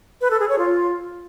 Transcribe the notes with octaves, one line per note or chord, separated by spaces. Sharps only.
B4
A4
G#4
C#5
F4